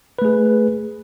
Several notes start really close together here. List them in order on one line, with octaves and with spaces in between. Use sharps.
B4 A3 G#4